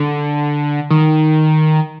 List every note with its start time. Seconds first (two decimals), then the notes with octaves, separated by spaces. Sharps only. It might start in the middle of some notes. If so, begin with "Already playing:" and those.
Already playing: D3
0.90 D#3